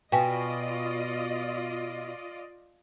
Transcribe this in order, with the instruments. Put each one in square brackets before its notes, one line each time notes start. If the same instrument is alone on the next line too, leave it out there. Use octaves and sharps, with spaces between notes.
[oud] B2 [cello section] F4 D5 D#5 [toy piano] F5 G5 G#5